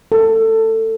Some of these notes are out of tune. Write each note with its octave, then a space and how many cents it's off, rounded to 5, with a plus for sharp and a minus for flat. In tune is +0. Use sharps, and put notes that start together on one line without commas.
A4 +20